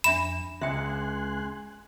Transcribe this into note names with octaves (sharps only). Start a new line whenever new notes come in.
F2 D4 E5 B5 E7
C#2 E5 G5 G#5 C6 F#6